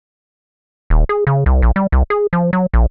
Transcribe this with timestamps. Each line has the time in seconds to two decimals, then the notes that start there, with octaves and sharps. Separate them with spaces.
0.90 D#1
1.09 G#4
1.27 C#3
1.46 C2
1.62 A#1
1.76 G3
1.92 C2
2.10 G#4
2.33 F3
2.53 F#3
2.74 A#1